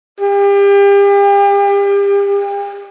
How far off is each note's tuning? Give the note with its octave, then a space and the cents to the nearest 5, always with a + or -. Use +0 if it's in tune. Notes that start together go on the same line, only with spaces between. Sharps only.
G4 +35